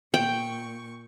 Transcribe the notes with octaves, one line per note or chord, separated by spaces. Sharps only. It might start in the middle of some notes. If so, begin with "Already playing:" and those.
A#2 G5 C#6